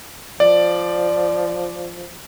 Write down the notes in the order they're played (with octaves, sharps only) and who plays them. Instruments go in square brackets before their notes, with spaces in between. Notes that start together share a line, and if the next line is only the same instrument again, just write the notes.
[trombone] F3 [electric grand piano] D5